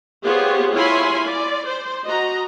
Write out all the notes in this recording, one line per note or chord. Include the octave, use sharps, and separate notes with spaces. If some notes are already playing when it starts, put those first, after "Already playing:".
B3 F4 G4 G#4 C5 C#5
E4 F4 C#5 G#5 B5 C6
D5
C5
F#4 D#5 A#5